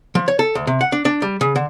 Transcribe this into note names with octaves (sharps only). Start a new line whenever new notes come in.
F3
C#5
A4
D2
C3
F#5
D4
D4
G3
C#3
D3